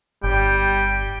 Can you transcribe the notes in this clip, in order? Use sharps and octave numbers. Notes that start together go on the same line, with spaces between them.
G1 G3 G5